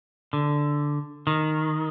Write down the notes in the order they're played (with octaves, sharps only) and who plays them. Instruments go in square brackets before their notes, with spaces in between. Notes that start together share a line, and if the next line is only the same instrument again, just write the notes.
[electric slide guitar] D3
D#3